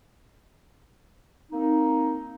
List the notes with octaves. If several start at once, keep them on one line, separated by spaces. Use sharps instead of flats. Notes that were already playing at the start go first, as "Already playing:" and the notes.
A#3 C4 D#4